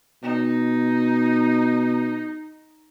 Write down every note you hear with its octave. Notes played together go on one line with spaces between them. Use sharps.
B2 D#4